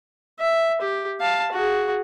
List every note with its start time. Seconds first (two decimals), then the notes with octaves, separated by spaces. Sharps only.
0.39 E5
0.81 G4
1.21 F5 A5
1.52 F#4 G#4